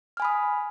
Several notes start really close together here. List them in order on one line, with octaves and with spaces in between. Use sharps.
F6 G#5 B5 D#6